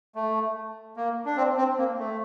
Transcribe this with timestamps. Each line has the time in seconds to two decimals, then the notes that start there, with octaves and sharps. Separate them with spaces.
0.15 A3
0.96 A#3
1.25 D4
1.37 C4
1.58 C4
1.78 A#3
1.99 A3